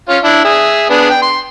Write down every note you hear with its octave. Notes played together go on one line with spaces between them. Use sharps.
C#4 F4
D4 E4
G#4 E5
B3 D4 G#4
G5
C6